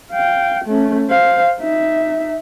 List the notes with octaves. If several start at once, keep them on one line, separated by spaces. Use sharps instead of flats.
F5 G5
A3 C#4
C5 F5
D#4 E5